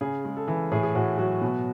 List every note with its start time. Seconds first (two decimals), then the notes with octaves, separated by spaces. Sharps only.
0.01 C#3 G#4
0.25 G#3
0.37 A4
0.48 E3
0.71 A2 G#4
0.83 G#4
0.95 A2 F#4
1.18 F#3 F#4
1.42 B2